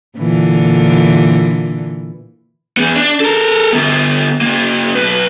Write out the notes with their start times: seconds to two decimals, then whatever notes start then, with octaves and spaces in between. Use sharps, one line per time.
0.18 A#2 D3 E3
2.77 E2 B3
2.95 D4
3.20 A4 A#4
3.73 D3 B3
4.41 C#3 A#3
4.95 B1 B4